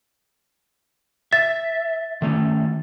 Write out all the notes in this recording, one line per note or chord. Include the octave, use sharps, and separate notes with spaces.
E5 A6
D#3 A3 C#4